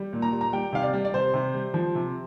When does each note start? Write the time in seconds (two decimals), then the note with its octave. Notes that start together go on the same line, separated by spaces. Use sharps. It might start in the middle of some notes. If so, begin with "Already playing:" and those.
Already playing: G3
0.13 A#2
0.22 A#5
0.32 G3
0.41 A#5
0.53 G3 G5
0.73 C3 F5
0.83 D5
0.94 G3
1.05 D5
1.14 C3 C5
1.34 C3
1.54 G3
1.74 F3
1.95 C3